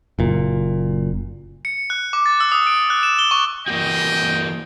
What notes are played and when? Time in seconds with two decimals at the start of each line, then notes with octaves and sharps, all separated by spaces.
0.19 F#1 A#2
1.65 C#7
1.90 F#6
2.13 D6
2.26 A6
2.40 E6
2.52 D#6
2.67 D7
2.90 F#6
3.03 E7
3.19 G7
3.31 C#6
3.68 E3 A#3 F#4 D#5 G5